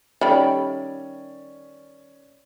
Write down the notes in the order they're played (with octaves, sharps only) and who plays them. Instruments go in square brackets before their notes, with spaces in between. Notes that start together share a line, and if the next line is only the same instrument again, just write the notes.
[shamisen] D#3 G3 B5 [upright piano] C#4 D5 [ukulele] A4 E5 G5